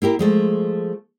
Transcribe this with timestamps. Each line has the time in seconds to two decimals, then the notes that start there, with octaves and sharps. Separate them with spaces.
0.02 A#3 E4 G4 A#4
0.19 F3 G#3 A3